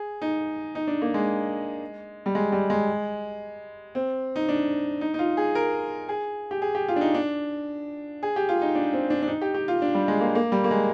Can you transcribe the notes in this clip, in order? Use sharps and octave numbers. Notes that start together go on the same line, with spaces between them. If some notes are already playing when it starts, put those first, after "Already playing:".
Already playing: G#4
D#4
D#4
D4
A#3
G#3
G3
G#3
G3
G#3
C4
D#4
D4
D#4
D#4
F4
G#4
A#4
G#4
G4
G#4
G4
F4
D4
D#4
D4
G#4
G4
F4
D#4
D4
C4
D4
D4
D#4
G4
G4
F4
D4
G3
G#3
A#3
A#3
G3
A#3
G#3